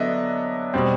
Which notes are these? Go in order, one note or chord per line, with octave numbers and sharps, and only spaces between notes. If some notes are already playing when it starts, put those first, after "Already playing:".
Already playing: D3 F#3 B3 D4 D#5 E5
B2 G3 C4